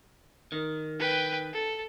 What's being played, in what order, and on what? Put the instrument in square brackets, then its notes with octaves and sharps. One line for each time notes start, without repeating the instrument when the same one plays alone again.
[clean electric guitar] D#3
[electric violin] B4 G5
A4